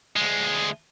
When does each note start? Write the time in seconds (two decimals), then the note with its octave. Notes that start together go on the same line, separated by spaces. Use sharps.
0.16 D2 G#3